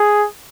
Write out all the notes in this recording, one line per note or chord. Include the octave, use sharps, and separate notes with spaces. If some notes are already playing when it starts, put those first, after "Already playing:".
Already playing: G#4